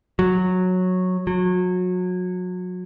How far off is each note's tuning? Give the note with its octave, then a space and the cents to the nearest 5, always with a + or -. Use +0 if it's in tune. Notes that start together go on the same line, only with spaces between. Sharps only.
F#3 -10
F#3 -30